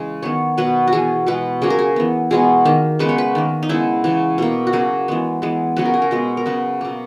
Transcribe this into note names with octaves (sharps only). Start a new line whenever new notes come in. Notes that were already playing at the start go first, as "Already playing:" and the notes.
Already playing: C#3 E3 G#3
D#3 F#3 B3 C#5
B2 F#3 B3 B4
F#4
E3 B3 G#4
B2 G#3 B3 B4
C#3 F#3 A#3 G#4
A#4
G#4
E3 B3
B2 G#3 B3 G#4
D#3 A#3
C#3 G#3 B3 B4
C#5
B4
D#3 A#3
D#4
C#3 G#3 B3 E4
C#3 E3 B3
B2 A#3
F#4
C#3 F#3 A#3 G#4
E3 G#3 B3
E3 G#3 B3
C#3 F#3 B3 B4
A#4
G#4
A#4
B2 G#3 B3
A#4
C#3 F#3 B3 B4
B2 A#3